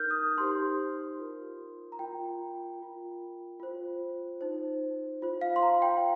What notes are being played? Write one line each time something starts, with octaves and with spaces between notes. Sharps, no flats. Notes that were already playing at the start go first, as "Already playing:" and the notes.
Already playing: D#4 A#4 F6 G6
D#6
D#4 G4 C5 C6
F4 A#4
A#5
F4 A#4 G5
F4 A#4
F4 C5
D#4 C5
F4 C5
F5
C6
A#5
G5